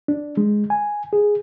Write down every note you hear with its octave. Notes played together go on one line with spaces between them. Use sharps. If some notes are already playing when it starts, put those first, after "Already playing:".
D4
G#3
G#5
G#4